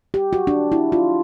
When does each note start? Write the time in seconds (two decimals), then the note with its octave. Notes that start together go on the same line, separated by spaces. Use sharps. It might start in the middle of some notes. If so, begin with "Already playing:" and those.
0.14 G4
0.33 F#4
0.47 D4
0.72 E4
0.92 F4